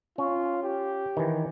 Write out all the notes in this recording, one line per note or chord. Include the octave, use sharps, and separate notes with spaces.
C#4 F4
G4
D#3 E3